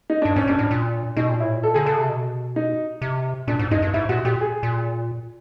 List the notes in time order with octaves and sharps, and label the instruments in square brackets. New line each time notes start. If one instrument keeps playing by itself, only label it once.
[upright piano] D#4
[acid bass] G2 [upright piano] D4
[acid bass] G#2 [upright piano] C#4
[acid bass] G#2 [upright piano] D4
[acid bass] A2
A#2
[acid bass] B2 [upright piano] D#4
[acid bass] A#2
[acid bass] A2 [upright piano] E4
[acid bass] A#2
[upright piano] A4
[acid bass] D3 [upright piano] G#4
[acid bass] C#3 [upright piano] A4
[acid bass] C3
B2
[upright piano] D#4
[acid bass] C3
[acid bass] A#2 [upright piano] D4
[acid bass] G#2
[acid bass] G2 [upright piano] D#4
[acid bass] G2
[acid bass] G#2 [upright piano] E4
[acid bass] A#2 [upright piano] F#4
[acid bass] A#2 [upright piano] G4
[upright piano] G#4
[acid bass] A#2